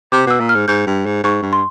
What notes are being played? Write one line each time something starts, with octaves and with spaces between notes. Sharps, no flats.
C3 D6
B2 E6
A#2
F6
G#2
G#2 G6
G2
G#2
G#2 C#6
G2
C6